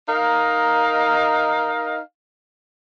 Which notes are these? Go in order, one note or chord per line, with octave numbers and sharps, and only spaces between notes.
D#4 A#4 D#5 F5